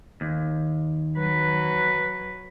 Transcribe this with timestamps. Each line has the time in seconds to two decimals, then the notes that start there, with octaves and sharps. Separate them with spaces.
0.21 D#2
1.18 F#3 B4